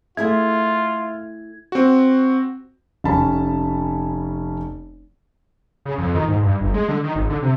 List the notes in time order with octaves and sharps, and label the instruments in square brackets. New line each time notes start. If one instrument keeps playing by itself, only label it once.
[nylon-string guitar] A3 E4 G#4 [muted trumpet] F4 [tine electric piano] E5 [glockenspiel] G#6
[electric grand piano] C4 F#4
[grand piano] F1 C#4 A5 B5
[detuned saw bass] C#3
F2
D#3
G#2
G2
G1
G#3
D3
D#3
G#1
D3
C3